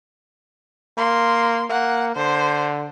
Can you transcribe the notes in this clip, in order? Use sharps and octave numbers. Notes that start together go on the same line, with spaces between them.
A#3 C6
A#3 F#5
D3 C5